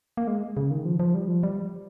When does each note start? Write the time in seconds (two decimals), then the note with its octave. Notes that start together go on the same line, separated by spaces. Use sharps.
0.17 A#3
0.27 G#3
0.57 C#3
0.71 D#3
0.85 F3
1.00 F3
1.14 G3
1.28 F3
1.43 G3